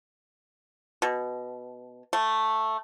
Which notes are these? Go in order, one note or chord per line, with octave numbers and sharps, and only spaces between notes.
B2
A3